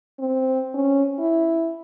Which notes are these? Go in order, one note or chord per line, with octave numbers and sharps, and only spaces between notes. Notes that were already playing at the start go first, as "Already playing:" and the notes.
C4
C#4
E4